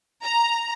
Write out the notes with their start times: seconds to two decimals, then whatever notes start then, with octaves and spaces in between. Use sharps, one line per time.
0.24 A#5